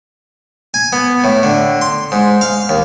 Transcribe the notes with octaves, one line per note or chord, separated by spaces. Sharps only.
G#5
B3
A2
D3
C6
G#2
F5
D#2